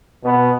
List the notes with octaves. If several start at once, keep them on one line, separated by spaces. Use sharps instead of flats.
B2 B3